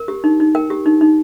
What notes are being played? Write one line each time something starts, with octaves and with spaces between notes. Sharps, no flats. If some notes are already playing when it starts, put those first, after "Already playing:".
Already playing: A#4
G4
D#4
D#4
A#4 G5
G4
D#4
D#4